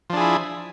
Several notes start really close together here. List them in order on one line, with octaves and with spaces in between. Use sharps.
F3 D4 G#4 E4